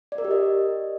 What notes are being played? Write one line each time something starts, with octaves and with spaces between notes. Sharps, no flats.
D5
A#4
G4
D#5